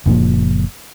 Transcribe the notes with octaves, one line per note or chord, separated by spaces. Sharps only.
F#1 A#2 F3 A#3